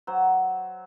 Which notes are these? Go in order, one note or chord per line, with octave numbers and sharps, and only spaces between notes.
F#3 C5